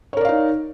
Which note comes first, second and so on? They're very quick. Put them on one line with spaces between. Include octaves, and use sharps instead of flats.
C#5 A#4 D5 F5 D#4